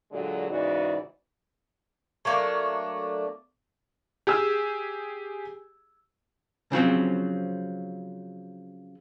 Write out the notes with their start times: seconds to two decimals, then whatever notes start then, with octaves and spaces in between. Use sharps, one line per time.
0.11 A#2 D3 F#3 G#3 F#4
0.49 G#2 C#3 E3 F#4 D5
2.25 F#3 A3 A#3 D4
4.27 G4 G#4 E6
6.72 C#3 F3 F#3 C4